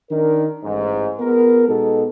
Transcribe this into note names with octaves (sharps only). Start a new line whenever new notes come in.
D#3 D4 D#4 A#4
A1 G#2
B3 F4 G#4 A#4
B2 G#3 B3 D#4 F#4 A4